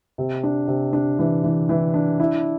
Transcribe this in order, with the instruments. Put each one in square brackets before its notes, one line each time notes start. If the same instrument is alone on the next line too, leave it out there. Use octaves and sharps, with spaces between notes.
[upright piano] C3
D4
C3
D4
E3
E3
E3
D4
E4